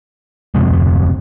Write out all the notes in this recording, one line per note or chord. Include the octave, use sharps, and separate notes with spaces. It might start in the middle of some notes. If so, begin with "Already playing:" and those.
D1 F2 C3 G#3
D1 F2 C3